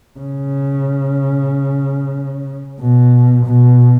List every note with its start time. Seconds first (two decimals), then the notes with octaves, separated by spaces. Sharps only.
0.20 C#3
2.80 B2
3.46 B2